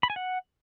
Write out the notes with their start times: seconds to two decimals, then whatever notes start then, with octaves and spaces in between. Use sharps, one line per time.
0.03 B5
0.10 G#5
0.16 F#5